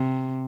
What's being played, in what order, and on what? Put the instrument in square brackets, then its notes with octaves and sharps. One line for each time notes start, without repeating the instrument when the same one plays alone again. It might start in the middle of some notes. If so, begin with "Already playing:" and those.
Already playing: [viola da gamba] C3